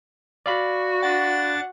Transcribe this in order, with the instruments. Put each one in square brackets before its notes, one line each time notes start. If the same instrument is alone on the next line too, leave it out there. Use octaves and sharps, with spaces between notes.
[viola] F#4 [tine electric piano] D5 F5 B5
[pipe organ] D4 A6 [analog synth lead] F#5